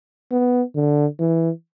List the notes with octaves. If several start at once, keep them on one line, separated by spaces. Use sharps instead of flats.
B3
D3
E3